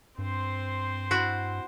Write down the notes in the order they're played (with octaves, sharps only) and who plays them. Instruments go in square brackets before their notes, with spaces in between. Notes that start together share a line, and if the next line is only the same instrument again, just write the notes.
[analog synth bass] G2 [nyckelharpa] C4 C5
[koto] E4 F#4